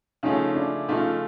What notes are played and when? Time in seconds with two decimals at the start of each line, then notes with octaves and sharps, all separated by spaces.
0.23 C#3 F3 A3 C#4 D#4
0.55 D4 E4
0.88 C#3 F3 A3 D#4 F4